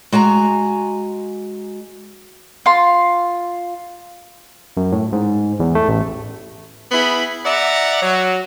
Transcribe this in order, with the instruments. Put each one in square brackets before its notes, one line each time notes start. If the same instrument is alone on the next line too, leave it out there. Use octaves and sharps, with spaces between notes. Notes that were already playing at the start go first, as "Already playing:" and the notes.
[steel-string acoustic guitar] G#3 F#4 G#5 A#5
[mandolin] F4 C6
[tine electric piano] F#2
A2
G#2
E2
A3
A1
[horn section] B3 E4 G#4 B5
D5 E5 F#5 A#5
F#3